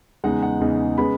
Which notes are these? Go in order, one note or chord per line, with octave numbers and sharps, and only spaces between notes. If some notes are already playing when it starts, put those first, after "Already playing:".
E2 C#3 G#3 D#4 F#5
F#5
E2 C#3 G#3 D#4
C#3 G#3 B3 B5